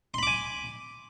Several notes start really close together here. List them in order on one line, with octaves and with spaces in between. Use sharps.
C6 B5 D6 G#5